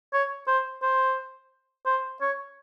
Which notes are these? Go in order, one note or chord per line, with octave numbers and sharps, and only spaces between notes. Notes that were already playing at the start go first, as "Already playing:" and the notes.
C#5
C5
C5
C5
C#5